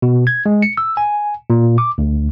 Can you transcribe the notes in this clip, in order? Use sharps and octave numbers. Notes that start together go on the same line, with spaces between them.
B2
G#6
G#3
C#7
E6
G#5
A#2
D6
D2